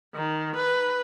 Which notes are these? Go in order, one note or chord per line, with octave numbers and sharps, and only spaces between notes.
D#3
B4